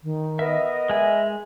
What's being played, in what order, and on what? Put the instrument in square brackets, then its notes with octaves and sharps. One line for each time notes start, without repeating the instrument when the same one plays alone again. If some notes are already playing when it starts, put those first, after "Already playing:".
[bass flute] D#3
[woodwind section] B3 A#4 D#5 [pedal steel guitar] E5
[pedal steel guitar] G#3 G#5 [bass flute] E5